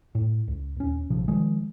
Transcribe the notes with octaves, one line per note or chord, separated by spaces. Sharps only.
A2
C#2
D#1 C#4
A#1 C3 F3
D#3 F3 G#3